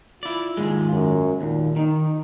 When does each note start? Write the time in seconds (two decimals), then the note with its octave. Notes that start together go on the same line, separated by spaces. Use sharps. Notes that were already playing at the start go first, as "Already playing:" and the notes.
0.23 E4 F4 D5
0.57 D#2 G#2 G#3
0.91 F#2
1.41 D#2 A#2
1.76 D#3 D#4